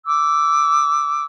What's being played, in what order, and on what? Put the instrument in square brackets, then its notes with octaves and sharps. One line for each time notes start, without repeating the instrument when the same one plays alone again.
[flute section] D6 E6